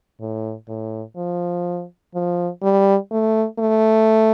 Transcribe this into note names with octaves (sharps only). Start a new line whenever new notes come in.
A2
A2
F3
F3
G3
A3
A3